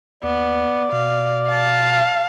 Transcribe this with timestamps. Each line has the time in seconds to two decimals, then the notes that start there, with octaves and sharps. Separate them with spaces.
0.23 D#2 B3 D5
0.92 B2 F5
1.50 F5 A5